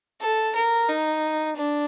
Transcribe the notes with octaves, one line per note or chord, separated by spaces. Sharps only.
A4
A#4
D#4
D4